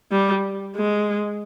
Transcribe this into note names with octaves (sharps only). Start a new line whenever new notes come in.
G3
G#3